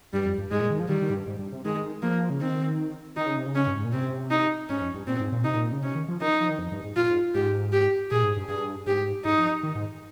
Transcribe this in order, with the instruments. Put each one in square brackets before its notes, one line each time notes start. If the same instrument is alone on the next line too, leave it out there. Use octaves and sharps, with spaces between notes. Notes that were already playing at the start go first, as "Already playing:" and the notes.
[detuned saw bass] G2 [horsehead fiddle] G3
[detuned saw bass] F2
G2
[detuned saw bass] G#2 [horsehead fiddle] G#3
[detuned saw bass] A#2
D#3
F3
[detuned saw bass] D#3 [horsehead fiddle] G3
[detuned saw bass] D#3
G#2
G2
G#2
G2
C3
[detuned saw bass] D#3 [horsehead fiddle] G#3
[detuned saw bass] F3 [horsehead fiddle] A#3
[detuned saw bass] C#3
[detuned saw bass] D#3 [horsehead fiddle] C4
[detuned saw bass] D#3 [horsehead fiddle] D#4
[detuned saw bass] C#3
C3
C#3
[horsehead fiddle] C#4
[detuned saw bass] G2
G#2
A#2
[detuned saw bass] C3 [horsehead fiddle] C4
[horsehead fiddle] D#4
[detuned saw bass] G#2 [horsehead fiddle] C#4
[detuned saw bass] F2
G2
[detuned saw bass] A#2 [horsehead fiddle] C4
[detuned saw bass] G#2
A#2
[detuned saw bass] C3 [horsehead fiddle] D#4
[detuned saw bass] A#2
C#3
[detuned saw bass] C3 [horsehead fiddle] C#4
[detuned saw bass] D#3
F3
[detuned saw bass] D#3 [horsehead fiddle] D#4
[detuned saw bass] F3
D#3
F2
G2
G#2
[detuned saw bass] A#2 [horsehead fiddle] F4
[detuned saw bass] G#2
[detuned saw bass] G#2 [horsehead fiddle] G4
[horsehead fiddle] G4
[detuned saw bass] A#2 [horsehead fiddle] G#4
[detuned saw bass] G#2
G2
[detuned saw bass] G2 [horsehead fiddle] G#4
[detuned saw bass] G#2 [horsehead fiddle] G4
[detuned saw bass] G#2 [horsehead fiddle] D#4
[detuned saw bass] F3
D#3
G#2